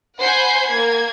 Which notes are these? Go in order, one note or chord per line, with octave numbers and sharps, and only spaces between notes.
C5 F#5 G#5 B5 G6 C7
A#3 G#6